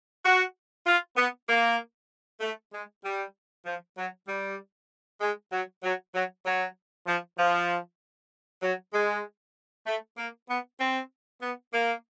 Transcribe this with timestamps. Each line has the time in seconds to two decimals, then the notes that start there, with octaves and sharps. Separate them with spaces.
0.24 F#4
0.86 F4
1.17 B3
1.48 A#3
2.40 A3
2.72 G#3
3.04 G3
3.65 F3
3.97 F#3
4.28 G3
5.21 G#3
5.52 F#3
5.83 F#3
6.14 F#3
6.45 F#3
7.07 F3
7.38 F3
8.62 F#3
8.93 G#3
9.86 A3
10.17 A#3
10.48 B3
10.80 C4
11.42 B3
11.73 A#3